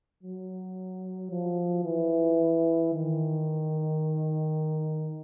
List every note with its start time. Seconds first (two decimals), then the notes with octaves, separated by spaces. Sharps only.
0.23 F#3
1.31 F3
1.85 E3
2.94 D#3